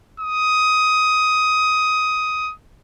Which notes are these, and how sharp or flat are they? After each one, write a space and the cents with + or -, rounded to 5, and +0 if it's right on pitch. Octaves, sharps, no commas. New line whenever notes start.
D#6 +15